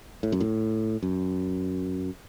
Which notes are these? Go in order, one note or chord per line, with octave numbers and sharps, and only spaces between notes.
A2
F#2
A2
F#2